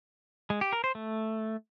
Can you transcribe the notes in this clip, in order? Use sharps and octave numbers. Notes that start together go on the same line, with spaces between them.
G#3
G4
A#4
C5
A3